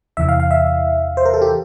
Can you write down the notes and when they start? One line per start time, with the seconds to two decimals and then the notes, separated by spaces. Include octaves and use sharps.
0.17 E2 C3 E3 E5
0.29 F5
0.40 F5
0.51 E5
1.17 C5
1.25 A#4
1.34 A4
1.42 G4